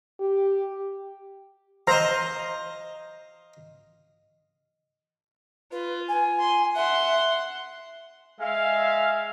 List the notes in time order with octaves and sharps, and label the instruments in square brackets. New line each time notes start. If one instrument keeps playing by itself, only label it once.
[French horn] G4
[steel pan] C5 A#5 [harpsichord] D#5 F5
[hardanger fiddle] F4 [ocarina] B4
[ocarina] G#5
[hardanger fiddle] C6
[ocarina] E5 [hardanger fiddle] F#5 C6
[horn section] G#3 E5 F5